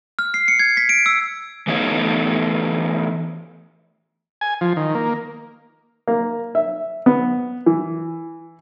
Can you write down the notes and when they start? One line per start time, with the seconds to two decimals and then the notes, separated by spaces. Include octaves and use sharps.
0.19 F6
0.34 C7
0.48 C#7
0.59 G#6
0.77 B6
0.89 D7
1.06 E6
1.67 E3 A3 B3 D#4 C#5
4.41 G#5
4.61 F3
4.76 D#3
4.95 A#3
6.08 A#3
6.55 E5
7.06 B3
7.66 E3